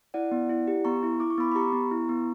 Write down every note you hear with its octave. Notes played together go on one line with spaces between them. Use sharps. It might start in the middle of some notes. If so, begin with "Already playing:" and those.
E4 D5 F#5
B3
E4
G4
B3 A#5 C#6
E4
E4 D6
C#6
B3 B5 D6
B5
G4 A#5 C#6
B3
E4
B3